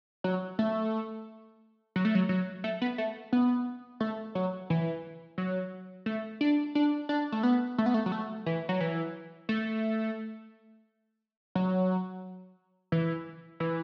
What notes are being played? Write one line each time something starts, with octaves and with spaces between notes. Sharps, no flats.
F#3
A3
F#3
A3
F#3
F#3
A3
B3
A3
B3
A3
F#3
E3
F#3
A3
D4
D4
D4
A3
B3
A3
B3
A3
F#3
A3
E3
F#3
E3
A3
F#3
E3
E3